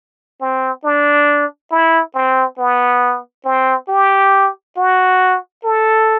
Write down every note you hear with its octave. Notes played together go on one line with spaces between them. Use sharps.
C4
D4
E4
C4
B3
C4
G4
F#4
A4